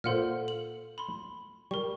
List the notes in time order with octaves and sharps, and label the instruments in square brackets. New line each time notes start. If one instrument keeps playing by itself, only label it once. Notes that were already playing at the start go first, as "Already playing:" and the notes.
[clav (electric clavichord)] A#2 F4 C5 [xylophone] A4 F#5 F6
[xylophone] F#7
B5 C6
[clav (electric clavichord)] G3 [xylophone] A#4 C#6